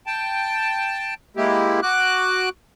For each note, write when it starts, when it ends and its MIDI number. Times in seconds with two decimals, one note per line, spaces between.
0.06 1.14 79
0.06 1.14 81
1.36 1.80 56
1.36 1.80 58
1.36 1.80 64
1.36 1.80 67
1.83 2.49 66
1.83 2.49 86
1.83 2.49 90